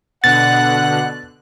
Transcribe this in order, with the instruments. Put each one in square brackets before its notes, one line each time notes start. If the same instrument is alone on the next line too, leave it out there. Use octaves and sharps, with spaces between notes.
[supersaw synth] B2 D3 F#6 [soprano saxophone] F#5 [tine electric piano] A6